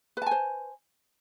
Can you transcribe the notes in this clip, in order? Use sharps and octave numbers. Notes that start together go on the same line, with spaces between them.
B4 C5 G#5 A5